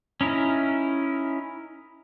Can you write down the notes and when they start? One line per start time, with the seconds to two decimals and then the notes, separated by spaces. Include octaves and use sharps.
0.21 C#4 D#4 E4 A#4